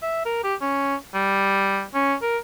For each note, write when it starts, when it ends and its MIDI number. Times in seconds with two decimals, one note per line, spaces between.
0.02 0.22 76
0.26 0.44 70
0.44 0.55 67
0.61 0.95 61
1.14 1.83 55
1.94 2.14 61
2.22 2.38 70